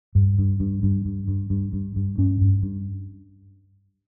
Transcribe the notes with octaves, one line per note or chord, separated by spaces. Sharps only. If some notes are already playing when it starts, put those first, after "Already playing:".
G2
G2
G2
G2
G2
G2
G2
G2
G2
G2 C#4
G2
G2